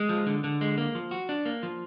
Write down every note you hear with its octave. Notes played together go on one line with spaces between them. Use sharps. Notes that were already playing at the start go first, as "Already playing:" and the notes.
Already playing: G#3
F3
D3
D3
G#3
A#3
F3
F#4
D4
A#3
F3